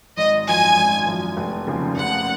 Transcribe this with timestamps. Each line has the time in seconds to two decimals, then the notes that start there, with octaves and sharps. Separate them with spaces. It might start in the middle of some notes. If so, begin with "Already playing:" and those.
0.17 G#1 D#5
0.48 F#2 F3 G#5
0.77 G#1
1.07 F#2 F3
1.37 F1
1.67 D#2 C#3 F3
1.96 F1 F#5